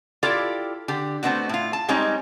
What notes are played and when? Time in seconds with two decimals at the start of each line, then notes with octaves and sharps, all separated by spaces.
0.23 E4 F4 G4 A4 D5
0.88 D3 G4
1.23 A3 B3 C4 D4 F#4
1.49 A2 F4
1.73 A5
1.89 G3 G#3 C4 D#4 C#5